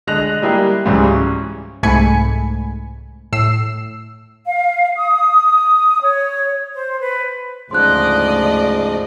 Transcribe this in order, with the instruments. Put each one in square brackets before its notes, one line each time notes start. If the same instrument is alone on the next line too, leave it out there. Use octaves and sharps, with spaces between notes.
[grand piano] D3 G#3 D#5 F#6 A#6 F7
G3 G#3 A#3 E4 G4 G#4
C#2 G#2 E3 F#3 G3
C#4
[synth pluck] C2 G#2 A3 G#5 B5 C#7
A2 E6 C7
[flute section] F5
D#6
C#5
C5
B4
[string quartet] D2 D5 D#5 [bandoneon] G#2 C#3 F3 [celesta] C6 F#6